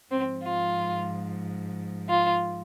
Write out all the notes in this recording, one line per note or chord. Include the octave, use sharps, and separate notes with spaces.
G#2 F3 C4
F4
F4